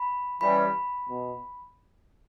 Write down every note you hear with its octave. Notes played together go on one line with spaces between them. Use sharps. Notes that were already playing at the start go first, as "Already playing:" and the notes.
Already playing: B5
E3 G3 C#4 B5
B2